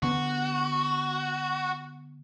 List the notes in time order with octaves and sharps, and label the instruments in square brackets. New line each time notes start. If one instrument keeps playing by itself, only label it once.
[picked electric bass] D3 B3 [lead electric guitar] F#4